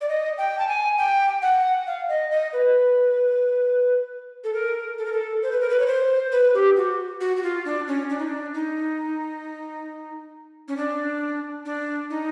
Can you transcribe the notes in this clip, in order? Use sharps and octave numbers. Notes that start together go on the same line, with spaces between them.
D5
D#5
G5
A5
G#5
G5
F#5
F5
D#5
D#5
B4
A4
A#4
A4
A#4
A4
C5
B4
A#4
B4
C#5
C5
B4
G4
F#4
F#4
F#4
F4
D4
C#4
D4
D#4
D4
D#4
C#4
D4
D4
D#4